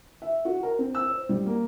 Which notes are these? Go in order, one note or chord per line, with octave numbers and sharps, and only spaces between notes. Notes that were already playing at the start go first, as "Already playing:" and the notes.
E5
F#4
A#4
C4
E6
C5
G3
A#3